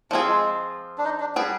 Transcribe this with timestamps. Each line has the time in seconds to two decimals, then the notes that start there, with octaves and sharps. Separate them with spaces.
0.11 F3 C4 D4 F4 G#4
0.27 G#3
0.98 D4
1.05 D#4
1.20 D4
1.36 G3 B3 D4 G#4